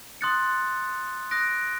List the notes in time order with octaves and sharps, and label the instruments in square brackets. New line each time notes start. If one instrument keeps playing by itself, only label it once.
[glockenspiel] C6 D#6 F#6 A6 C#7
D#6 F#6 A#6 D7